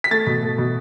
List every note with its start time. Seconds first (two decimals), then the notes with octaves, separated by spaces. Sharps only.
0.04 B6
0.11 A3 A6
0.27 B2
0.43 A3
0.58 B2